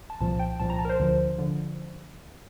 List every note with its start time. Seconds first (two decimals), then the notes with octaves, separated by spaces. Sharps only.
0.10 A5
0.20 C2 A#2 F3 A5
0.39 G5
0.60 C2 A#2 F3 A5
0.70 A#5
0.79 A5
0.85 A#4
0.89 C5
1.00 D2 D3 F3
1.39 D3 F3